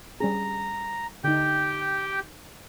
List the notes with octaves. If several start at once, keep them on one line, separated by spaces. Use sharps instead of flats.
G3 C#4 G#4 A#5
D3 D#4 G4 G5